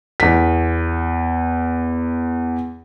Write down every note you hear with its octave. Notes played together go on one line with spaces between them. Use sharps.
E2 B6